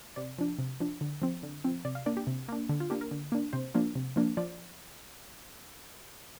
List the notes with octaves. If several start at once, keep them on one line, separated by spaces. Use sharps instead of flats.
C3 D5
F3 D4
C3
F3 D4
D3
F3 C4
D3
F3 C4
C3 D5
F5
A#3 D4 D5
G4
C3
A#3 D4
D3
F4
A#3 D4 G4
A#4
D3
A#3 D4
C3 C5
F3 A#3 D4
C3
F3 A#3 D4
F3 D5